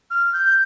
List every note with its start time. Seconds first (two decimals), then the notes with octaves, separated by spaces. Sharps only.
0.10 F6
0.33 G6